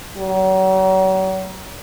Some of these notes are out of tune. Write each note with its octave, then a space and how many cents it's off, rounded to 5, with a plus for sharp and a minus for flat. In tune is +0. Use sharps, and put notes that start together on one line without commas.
F#3 +40